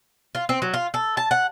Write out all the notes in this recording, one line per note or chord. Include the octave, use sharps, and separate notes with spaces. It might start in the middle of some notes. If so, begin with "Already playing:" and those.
F4
C4
F#3
F4
A4
A5
F#5